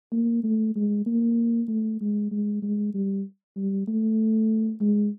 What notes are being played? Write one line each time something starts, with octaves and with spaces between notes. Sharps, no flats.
A#3
A3
G#3
A#3
A3
G#3
G#3
G#3
G3
G3
A3
G#3